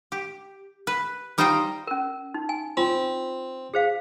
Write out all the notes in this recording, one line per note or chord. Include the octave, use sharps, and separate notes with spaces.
G4
B4
G3 D#4 F4 C5 D#5 G5
C#4 A#4
D#4
G#5
C4 F4
G#4 C5 F5